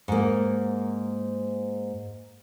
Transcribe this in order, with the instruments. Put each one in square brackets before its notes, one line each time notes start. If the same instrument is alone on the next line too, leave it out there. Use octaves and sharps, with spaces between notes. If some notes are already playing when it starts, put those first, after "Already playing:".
[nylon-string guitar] G#2 A#3